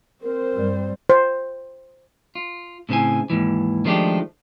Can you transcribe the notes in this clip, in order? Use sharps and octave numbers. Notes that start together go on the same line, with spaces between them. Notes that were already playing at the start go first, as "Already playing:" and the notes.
C4 A#4 C5
G2 G3
C5
F4
A2 C#3 C4 E4 G#5
D#2 G#2 E3
D#3 F3 G#3 A3 D4 G4